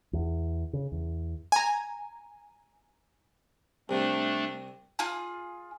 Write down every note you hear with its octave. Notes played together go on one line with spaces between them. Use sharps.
E2
C#3
E2
G#5 A#5
C2 C3 A3 D4
F4 G#4